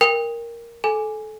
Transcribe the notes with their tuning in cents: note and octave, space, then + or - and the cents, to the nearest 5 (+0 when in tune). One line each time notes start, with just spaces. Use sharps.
A#4 +0 G5 +30
A4 -25 G#5 +0